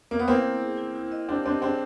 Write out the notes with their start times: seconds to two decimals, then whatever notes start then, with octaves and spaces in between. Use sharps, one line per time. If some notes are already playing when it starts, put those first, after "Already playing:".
0.11 A#3
0.19 B3
0.28 A#3 C4 E4
0.44 E4
0.61 G#4
0.78 E4
0.95 E4
1.12 D#5
1.28 C4 D4 G4
1.46 C4 D4 D#5
1.62 C4 D4 G#4